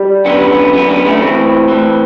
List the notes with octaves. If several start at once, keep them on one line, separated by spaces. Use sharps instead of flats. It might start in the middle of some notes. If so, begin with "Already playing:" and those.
Already playing: G3
F#2 D3 B3
F#2 D3 B3
B3
A3
A2 E3 C4
A2 E3